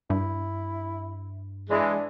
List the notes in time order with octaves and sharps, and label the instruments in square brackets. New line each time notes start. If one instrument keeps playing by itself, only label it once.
[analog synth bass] G2 [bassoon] E4
[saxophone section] E3 G#3 [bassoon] D4